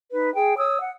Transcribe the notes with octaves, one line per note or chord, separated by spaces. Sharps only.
D#4 B4
G#4 G5
C#5 D#6 E6
F#5